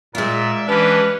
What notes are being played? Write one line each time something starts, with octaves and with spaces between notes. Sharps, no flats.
A#2 G#3 F4 A#4 D5 E5
E3 C#4 D4 G4 B4